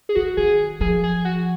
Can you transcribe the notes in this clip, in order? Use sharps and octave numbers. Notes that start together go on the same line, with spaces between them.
G#4
D#3 F#4
D#3 G#4
F3 G#4
G#4
F#4